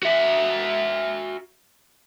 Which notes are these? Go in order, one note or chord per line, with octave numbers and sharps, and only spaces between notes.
F#4 E5